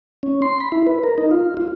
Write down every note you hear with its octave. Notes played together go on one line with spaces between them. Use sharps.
C#4
C6
B5
E4
B4
A#4
D#4
F4
F4